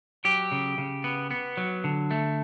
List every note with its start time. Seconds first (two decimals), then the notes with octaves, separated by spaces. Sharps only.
0.25 F#3 G4
0.52 C#3
0.78 C#3
1.04 B3
1.31 B3
1.57 F#3
1.84 D3
2.11 A3